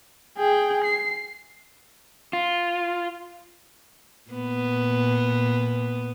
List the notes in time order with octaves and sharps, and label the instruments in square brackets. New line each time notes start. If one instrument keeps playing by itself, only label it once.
[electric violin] G#4 G5
C7
[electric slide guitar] F4
[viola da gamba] A#2 B3